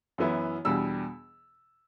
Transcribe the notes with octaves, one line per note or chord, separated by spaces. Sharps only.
F#2 E3 B3 E4
E2 B2 G3 D4 E6